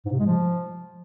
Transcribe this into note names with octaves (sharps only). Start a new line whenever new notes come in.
G#2
C3
G#3
F3